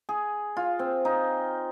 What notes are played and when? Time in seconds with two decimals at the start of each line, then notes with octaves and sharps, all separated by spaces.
0.09 G#4
0.57 F4
0.79 C4
1.05 D#4